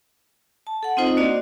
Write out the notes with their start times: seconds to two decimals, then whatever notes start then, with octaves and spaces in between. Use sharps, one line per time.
0.67 A5
0.83 A4 F#5
0.97 C4 D#4 F4 C5 D#5
1.17 A#3 D4 F#4 D5 D#5